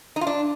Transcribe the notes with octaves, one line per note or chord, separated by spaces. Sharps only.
D#4
F4
D4